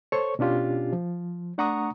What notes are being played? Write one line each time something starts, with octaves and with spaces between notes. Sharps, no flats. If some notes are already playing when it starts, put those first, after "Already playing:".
A4 C5 C#5 C#6
B2 C#4 D4 F4 G4
F3
A3 D4 F#5 A#5 C#6 D#6